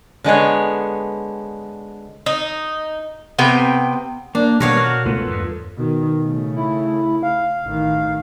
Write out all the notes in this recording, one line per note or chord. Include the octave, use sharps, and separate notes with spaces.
D3 G#3 B3 C#5
D#4
C3 B3 G5
A#3 D4
B2 G3 B3 A#4 C#5 F5
F#4 F6
C#2 A3 B3 F4 A4 B4
E2 G2
B2 D#3
C#3 A3
E4
F5
A1 D#3